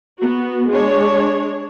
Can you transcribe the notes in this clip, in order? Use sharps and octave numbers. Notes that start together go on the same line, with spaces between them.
B3 F#4
G#3 D4 C#5